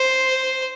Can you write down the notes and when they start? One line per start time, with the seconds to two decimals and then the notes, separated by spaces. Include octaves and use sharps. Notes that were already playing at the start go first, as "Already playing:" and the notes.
Already playing: C5